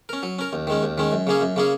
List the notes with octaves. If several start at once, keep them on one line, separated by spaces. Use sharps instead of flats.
C#4 A#4
F#3
C#4 A#4
D#2
D#3 G#3 C#4
D#2
D#3 G#3 C#4
F#2
C#3 A#3 C#4 G#4
F#2
C#3 A#3 C#4 G#4